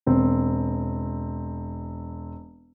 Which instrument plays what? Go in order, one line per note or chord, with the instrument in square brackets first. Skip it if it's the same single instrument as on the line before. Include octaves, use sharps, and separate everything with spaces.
[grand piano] E1 C4